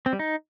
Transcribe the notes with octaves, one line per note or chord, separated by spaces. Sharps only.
C4
G3
D#4